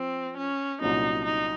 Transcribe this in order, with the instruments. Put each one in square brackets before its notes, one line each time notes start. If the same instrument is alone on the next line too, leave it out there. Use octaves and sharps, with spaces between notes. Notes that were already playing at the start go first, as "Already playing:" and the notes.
Already playing: [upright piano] F3 [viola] C4
[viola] C#4
[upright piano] C2 A#2 F#3 C#4 [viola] D#4
[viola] D#4